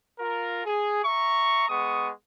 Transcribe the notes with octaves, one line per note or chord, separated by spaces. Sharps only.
F4 A#4
G#4
E5 A#5 C#6
G#3 B3 C#6 D#6